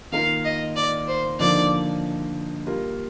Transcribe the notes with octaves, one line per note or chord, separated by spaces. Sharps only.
D#3 A#3 F4 A#4 F5
D#5
D5
C5
D3 F3 A#3 D#4 D5
G3 A#3 F4 A#4